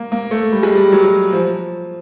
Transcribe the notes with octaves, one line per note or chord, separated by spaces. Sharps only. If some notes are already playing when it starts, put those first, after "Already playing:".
Already playing: A#3
A#3
A3
G3
G#3
G3
F#3
F3